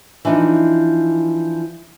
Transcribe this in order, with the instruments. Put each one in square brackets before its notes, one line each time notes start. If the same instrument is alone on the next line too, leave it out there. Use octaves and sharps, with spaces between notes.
[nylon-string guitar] E3 F3 D4 D#4